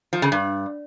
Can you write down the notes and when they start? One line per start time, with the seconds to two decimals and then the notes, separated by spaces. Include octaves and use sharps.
0.13 F3
0.22 C#3
0.32 G2